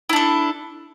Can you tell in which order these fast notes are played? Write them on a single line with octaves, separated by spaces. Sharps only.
E4 D4 A4